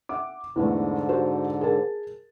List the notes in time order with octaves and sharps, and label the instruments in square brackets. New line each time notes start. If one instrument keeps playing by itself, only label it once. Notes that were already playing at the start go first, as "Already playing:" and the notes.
[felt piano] E5 F#5 D6
[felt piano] E2 E3 A3 [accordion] G#2 D3
[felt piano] F#4 C5
G#4 A#4 A5